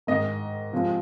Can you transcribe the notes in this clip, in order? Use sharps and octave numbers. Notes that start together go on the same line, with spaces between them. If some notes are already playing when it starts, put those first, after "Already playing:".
G#2 D#3 G#3 D#5
C3 F3 G#3 C4